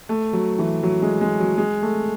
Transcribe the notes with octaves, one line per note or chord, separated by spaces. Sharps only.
A3
F#3
E3
F#3
G#3
G#3
F#3
G#3
A3